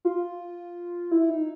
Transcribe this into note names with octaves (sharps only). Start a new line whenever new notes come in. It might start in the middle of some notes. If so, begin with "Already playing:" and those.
F4
E4
D#4